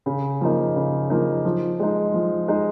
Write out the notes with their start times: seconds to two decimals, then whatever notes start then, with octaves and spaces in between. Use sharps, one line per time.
0.06 C#3
0.41 F3 A#3 D#4
0.76 C#3
1.10 F3 A#3 D#4
1.45 F3
1.79 G#3 D#4
2.14 F3
2.48 G#3 D#4